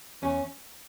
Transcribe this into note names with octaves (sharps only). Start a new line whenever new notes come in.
E2 C#4